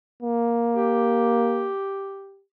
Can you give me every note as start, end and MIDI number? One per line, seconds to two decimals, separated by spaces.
0.22 1.72 58
0.74 2.42 67